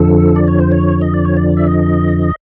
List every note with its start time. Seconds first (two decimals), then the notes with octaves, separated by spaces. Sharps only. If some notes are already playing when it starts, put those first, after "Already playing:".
Already playing: F2 D3 F3 A4
0.36 D5
0.48 C#5
0.60 C5
0.72 C#5
1.01 D#5
1.14 D5
1.25 C#5
1.37 D5
1.57 E5
1.67 D#5